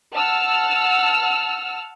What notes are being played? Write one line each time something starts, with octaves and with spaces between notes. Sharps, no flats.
F#5 A5 E6 F6